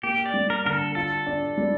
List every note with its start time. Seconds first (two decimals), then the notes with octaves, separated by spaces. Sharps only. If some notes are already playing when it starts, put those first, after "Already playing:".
0.03 A#3 G4
0.26 D5
0.34 G3
0.50 A#4
0.65 D3 A#4
0.72 A4
0.95 F4 A4
1.27 D4
1.57 G3